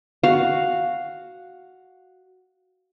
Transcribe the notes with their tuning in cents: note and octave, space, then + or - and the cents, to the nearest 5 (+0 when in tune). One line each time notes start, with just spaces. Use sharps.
F#4 +0 F5 +0